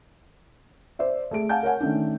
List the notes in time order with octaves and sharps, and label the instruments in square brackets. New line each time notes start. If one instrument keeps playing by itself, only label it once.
[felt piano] C5 D5 E5
A3 G#4 D7
F5 F#5 G#5 A5 G6
A#4 C#5 F#5 G#5
D#3 A3 C#4 D4